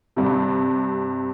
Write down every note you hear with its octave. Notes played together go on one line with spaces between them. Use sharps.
G2 C3